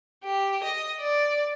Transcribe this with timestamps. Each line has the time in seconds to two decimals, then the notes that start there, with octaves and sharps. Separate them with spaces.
0.24 G4
0.63 D#5
1.01 D5